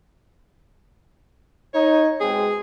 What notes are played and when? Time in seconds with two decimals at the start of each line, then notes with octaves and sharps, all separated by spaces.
1.74 D#4 C#5
2.20 B2 G#3 C4 G#4